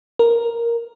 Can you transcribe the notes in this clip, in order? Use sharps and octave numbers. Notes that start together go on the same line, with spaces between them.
A#4